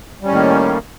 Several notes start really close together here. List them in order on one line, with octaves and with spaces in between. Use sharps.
G3 C#4 A2 D#3 A#3